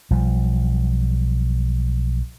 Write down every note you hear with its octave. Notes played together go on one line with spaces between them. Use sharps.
B1 F3 G3